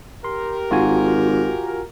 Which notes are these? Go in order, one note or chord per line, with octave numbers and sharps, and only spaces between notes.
G4 A#4 C6
G#1 F4 F#4 G#5